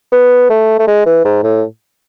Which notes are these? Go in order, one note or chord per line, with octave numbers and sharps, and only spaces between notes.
B3
A3
A3
G#3
E3
G#2
A2